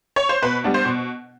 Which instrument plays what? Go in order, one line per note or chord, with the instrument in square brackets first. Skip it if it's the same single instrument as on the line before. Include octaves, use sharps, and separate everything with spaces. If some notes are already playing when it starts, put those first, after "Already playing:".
[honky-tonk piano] C#5
C5
B2 B4
G3 B3 D4
C5
B2